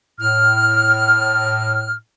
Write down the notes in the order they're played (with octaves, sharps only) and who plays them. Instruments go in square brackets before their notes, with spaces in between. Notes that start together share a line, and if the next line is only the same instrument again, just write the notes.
[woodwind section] A2 F6